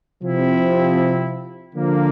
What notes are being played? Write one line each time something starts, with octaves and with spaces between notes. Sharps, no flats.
C3 F3 C4 E4
D3 F3 A#3